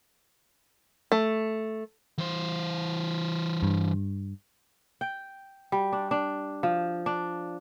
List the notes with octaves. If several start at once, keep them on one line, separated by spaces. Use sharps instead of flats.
A3
E3 C5
G2
G5
G3
D4
D4
F3
D4